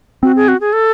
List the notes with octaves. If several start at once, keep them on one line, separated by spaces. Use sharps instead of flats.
C4 F#4
G#4
F#4
G#4
A4